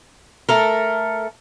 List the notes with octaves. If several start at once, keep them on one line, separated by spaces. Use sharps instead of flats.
A3 A4 A#4